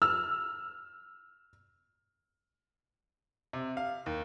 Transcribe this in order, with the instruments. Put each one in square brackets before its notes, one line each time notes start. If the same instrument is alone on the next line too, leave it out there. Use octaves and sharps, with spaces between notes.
[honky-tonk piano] E6 F6
[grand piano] C3
F5
D#2